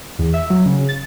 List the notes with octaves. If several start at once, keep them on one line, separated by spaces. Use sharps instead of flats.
E2
E5
F#3
C#3
A6